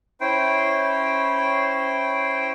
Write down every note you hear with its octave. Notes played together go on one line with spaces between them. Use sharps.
C#4 E4 C5 G5